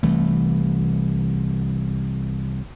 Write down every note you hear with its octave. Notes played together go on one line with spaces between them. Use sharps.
C2 E3 A3